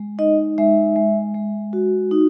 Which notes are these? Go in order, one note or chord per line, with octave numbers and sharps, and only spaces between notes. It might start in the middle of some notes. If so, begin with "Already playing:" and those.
Already playing: G#3
D#4 D#5
G#3 E5
G#3
G#3
F#4
D#4